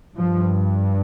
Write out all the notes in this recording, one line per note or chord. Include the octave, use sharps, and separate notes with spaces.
G2 F3